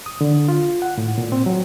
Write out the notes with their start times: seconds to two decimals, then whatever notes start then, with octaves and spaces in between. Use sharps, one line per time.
0.06 D#6
0.21 D3
0.48 F4
0.82 F#5
0.98 A2
1.18 A#2
1.32 C4
1.46 F#3